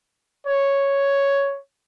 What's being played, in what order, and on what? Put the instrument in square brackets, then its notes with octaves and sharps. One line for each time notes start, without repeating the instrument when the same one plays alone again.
[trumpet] C#5